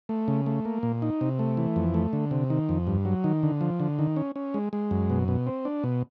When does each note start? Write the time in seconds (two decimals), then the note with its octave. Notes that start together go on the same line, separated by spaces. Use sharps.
0.09 A3
0.28 C#3
0.46 A3
0.65 A#3
0.83 A#2
1.02 D#4
1.21 C3
1.39 A3
1.57 E3
1.76 F2
1.94 A3
2.13 D3
2.31 C3
2.50 D#3
2.69 F2
2.87 G2
3.05 F#3
3.24 D#3
3.43 D3
3.61 F3
3.80 D3
3.99 D#3
4.16 C#4
4.36 C#4
4.54 G#3
4.73 G#3
4.91 F#2
5.10 B2
5.28 B2
5.47 C4
5.65 D4
5.84 B2